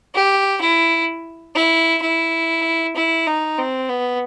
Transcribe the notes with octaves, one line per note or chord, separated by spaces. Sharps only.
G4
E4
E4
E4
E4
D#4
C4
B3